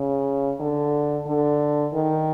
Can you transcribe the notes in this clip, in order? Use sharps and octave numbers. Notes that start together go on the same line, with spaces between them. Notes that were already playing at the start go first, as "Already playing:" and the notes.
Already playing: C#3
D3
D3
D#3